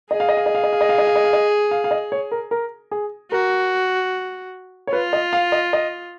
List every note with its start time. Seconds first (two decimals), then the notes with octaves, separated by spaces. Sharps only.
0.11 G#4 D#5
0.20 F5
0.29 D#5
0.37 F5
0.46 D#5
0.55 F5
0.64 D#5
0.73 F5
0.81 D#5
0.89 F5
0.98 D#5
1.07 F5
1.16 D#5
1.24 F5
1.33 D#5
1.71 F5
1.84 F5
1.91 D#5
2.12 C#5
2.32 A#4
2.51 A#4
2.91 G#4
3.32 F#4 A#4
4.87 C#5
4.93 F4 B4
5.13 D#5
5.33 F5
5.52 D#5
5.73 D#5